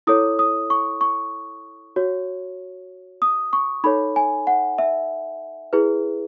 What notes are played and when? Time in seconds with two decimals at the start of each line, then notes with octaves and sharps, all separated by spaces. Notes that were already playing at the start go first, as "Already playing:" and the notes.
0.07 E4 A4 C#5 D#6
0.39 D#6
0.70 C#6
1.01 C#6
1.96 F#4 C#5
3.22 D#6
3.53 C#6
3.84 D#4 A4 C#5 B5
4.16 G#5
4.47 F#5
4.79 E5
5.73 E4 G#4 B4